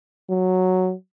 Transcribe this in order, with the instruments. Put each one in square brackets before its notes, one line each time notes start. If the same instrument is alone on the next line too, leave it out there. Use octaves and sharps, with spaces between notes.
[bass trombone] F#3